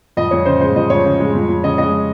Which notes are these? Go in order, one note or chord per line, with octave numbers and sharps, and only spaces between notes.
F2 D#5
F2 C#5
C#3 C5
G#3 C5
F2 D#5
F2 C#5
C#3
G#3
F2
F2
C#3 D#5
G#3 D#5